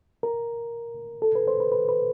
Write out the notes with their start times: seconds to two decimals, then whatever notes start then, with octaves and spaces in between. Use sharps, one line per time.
0.23 A#4
1.22 A4
1.35 B4
1.48 C5
1.60 B4
1.72 B4
1.89 B4